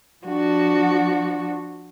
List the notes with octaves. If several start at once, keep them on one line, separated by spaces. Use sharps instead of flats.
F3 D4 F#4